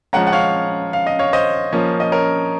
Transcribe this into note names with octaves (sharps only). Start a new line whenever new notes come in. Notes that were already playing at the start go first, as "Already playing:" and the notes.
F3 G#3 C#4 F#5 A#5
F#5
C#5 F5
F5
D#5
C#5 F5
C5 D#5
F3 A#3 C#4
D#5
A#4 C#5